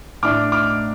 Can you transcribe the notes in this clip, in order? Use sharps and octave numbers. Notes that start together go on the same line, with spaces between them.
A2 A3 D4 D6 F6
D6 F6